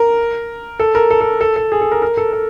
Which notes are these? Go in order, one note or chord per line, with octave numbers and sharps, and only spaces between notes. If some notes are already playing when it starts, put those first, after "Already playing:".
Already playing: A#4
A4
A#4
A4
A4
A4
A4
G#4
A4
A#4
A#4
A4
A4